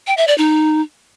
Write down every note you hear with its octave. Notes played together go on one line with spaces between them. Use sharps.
G5
E5
D5
D#4